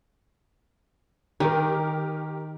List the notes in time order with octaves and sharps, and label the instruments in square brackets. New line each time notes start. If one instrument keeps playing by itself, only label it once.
[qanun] D#3 [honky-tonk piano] G4 A#4